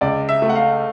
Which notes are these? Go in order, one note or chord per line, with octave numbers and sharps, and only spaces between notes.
C#2 D5
E5
A3
F#5
F5